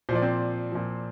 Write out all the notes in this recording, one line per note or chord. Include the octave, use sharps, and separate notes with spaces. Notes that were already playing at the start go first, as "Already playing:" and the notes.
A#2 F3 C5 D5
C4 C5
A#2 F3